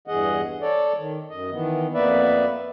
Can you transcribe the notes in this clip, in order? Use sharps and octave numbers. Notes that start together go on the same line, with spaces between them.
E2 G2 E3 G#4 D#5 F#5
A4 C#5 D5
D#3
F#2 D#5
D#3 E3 B3
F2 A#3 B3 B4 D5 E5